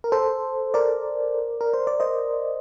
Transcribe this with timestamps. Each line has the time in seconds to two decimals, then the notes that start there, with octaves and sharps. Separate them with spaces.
0.04 A#4
0.12 A4 C5
0.74 A#4 D5
1.61 A#4
1.74 C5
1.87 D5
2.00 C5 D#5